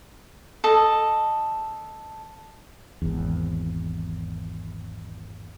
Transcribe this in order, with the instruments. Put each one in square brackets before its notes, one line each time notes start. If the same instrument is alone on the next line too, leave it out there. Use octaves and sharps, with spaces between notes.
[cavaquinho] A4 D#5
[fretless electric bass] G#1 E2